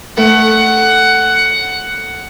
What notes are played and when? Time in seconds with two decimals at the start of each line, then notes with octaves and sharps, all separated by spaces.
0.17 A3 F#5